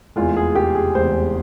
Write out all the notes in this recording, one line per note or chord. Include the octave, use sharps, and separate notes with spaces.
F1 E2 E3 G#3 F4
G#4
G4
G#4
F1 E2 E3 G#3 C5